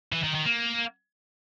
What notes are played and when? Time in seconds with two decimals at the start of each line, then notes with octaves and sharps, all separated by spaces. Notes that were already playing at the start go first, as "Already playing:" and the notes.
0.12 E3
0.23 D#3
0.35 D#3
0.46 A#3